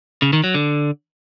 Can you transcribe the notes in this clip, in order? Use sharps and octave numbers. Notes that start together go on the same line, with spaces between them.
C#3
D#3
F#3
D3